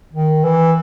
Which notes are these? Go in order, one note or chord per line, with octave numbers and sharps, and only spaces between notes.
D#3
E3